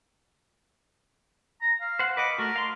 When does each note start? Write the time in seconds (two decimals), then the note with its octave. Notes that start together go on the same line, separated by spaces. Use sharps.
1.62 A#5
1.81 F5
1.99 C5 F#5
2.17 B4 D#5 F#5 D6
2.38 A3 F#4 A#4
2.56 F5 C6